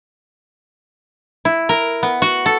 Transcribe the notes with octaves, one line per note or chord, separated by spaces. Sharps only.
E4
A#4
B3
F#4
A4